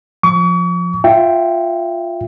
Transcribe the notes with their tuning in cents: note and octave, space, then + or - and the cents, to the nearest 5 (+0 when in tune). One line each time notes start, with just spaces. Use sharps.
F3 +10 C#6 +40
F4 +0 E5 +20 G5 +0